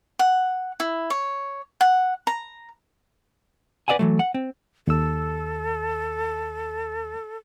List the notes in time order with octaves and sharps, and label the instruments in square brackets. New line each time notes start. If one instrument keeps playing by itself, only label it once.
[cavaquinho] F#5
E4
C#5
F#5
A#5
[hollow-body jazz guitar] B4 D5 E5 F#5 G#5
E3 F#3 A3
F#5
C4
[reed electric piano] D#2 E6 [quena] A4